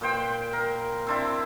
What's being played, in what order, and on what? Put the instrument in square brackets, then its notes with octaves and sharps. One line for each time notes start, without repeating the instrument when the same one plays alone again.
[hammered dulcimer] A#2 B4 C5 G5
A#4
C4 D4 E4